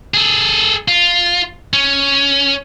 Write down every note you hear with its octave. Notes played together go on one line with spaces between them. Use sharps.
G#4 A4
F4
C#4